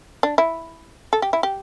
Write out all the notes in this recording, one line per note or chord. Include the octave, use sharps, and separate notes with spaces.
D4
E4
A4
G4
E4
G4